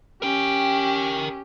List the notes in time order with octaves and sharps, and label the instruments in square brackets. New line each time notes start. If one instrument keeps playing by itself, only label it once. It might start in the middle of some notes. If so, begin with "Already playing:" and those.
[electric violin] C#4 G4 [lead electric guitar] A#4 G5